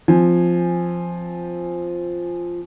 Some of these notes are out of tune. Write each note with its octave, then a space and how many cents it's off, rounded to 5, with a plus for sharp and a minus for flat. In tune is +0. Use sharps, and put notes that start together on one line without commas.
F3 +0 C4 +0 G#5 +0